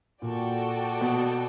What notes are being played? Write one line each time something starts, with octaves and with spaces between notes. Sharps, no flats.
A#2 F#4 A4 D5 G5
B2